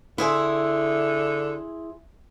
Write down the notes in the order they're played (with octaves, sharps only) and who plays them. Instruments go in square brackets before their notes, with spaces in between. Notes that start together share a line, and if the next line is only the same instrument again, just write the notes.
[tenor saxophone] D3 [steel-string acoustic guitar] E4 G#4 C5